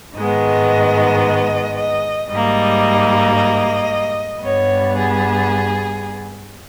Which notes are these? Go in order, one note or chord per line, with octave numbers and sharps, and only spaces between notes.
G#2 D#3 G#3 B3 D#5
D#5
G#2 G3 A#3 D#5
D#5
G2 G3 B3 C#5
G#4